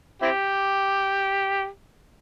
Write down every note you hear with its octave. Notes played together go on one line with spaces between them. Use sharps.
C4 E4 G4